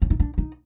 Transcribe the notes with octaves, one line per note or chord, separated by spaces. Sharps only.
C#4
D#4
D4
D#4